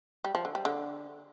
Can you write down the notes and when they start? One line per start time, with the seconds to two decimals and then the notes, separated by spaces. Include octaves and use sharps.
0.24 G3
0.35 F3
0.45 D3
0.55 G3
0.65 D3